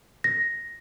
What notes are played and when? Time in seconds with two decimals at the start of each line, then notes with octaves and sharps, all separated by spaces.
0.24 A#6